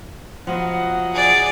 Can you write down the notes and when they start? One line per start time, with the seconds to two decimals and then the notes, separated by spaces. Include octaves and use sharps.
0.47 F3 F#3 B3 D#5 F#5
1.14 G#4 D5